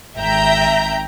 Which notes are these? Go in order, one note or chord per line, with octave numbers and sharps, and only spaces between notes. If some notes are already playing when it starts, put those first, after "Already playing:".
G#1 E5 G5 A#5 G6